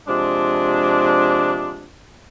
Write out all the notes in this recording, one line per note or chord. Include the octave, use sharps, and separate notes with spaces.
C3 F3 G#3 D4